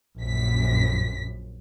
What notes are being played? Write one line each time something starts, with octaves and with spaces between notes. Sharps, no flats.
A#1 F#2 B6